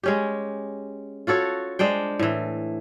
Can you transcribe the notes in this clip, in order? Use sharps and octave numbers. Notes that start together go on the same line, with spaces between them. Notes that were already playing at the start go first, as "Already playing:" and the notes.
G#3 C#4 G4
F4 F#4 A4 C#5
G#3 D4 C5 G5
A2 E3